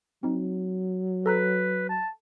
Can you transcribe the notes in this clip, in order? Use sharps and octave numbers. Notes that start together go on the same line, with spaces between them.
F#3 C4 D#4
A4 B4 A#5 F#6
A5